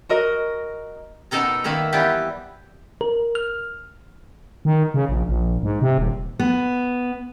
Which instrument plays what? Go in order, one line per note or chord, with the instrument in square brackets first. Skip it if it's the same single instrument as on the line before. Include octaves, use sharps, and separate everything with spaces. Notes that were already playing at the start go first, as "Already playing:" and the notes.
[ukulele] F#4 A#4 D#5
[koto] B2 D#4 A4 A#4 A#5
D#3 A#3 E5 A#5
E3 G3 B3 G4
[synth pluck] A#4
F6
[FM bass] D#3
C#3
A#1
A#1
G#2
C3
D#1
[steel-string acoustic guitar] B3